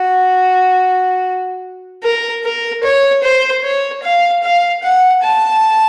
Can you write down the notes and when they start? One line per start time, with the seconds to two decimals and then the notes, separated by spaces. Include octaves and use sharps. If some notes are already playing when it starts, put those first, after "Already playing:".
Already playing: F#4
2.03 A#4
2.44 A#4
2.84 C#5
3.23 C5
3.64 C#5
4.03 F5
4.43 F5
4.83 F#5
5.23 A5